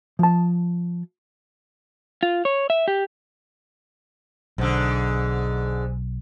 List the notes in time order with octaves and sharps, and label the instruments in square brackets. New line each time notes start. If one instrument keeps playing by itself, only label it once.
[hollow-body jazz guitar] F3 A5
[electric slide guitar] F4
C#5
E5
G4
[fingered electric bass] B1 [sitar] G#2 D3